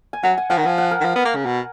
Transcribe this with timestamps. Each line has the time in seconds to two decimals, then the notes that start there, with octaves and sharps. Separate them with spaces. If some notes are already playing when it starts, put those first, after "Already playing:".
0.13 G#5
0.23 F#3 F#5
0.37 G#5
0.50 F3 F#5
0.58 D#3
0.63 F3 G#5
0.78 F#5
0.91 A#4
1.01 D#3
1.05 F3
1.16 B3
1.25 A#3
1.35 C#3
1.45 B2